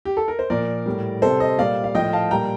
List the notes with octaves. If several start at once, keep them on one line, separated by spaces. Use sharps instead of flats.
G4
A4
A#4
C5
A#2 F3 A#4 D5
A2 G3
C3 G3 A4 C5
C5 D#5
A#2 G3 D5 F5
F5
A2 F3 D#5 G5
F5 A5
A#2 G3 G5 A#5